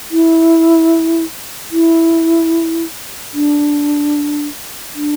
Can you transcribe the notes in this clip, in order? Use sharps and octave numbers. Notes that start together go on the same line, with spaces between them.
E4
E4
D4
D4